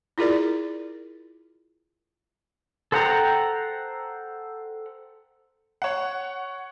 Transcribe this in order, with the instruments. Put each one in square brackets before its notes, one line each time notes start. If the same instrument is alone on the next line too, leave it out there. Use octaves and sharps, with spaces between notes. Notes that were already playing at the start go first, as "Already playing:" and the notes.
[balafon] E4 F4 G#4 A#4 D5
[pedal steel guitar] A4 C5 F#5 G5 A#5
[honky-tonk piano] C#5 F#5